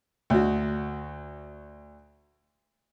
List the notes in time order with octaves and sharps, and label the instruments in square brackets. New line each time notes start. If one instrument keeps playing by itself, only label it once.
[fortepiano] D2 F#4